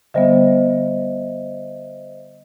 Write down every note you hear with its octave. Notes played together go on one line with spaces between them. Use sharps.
D3 G3 B3 C5 D#5 E5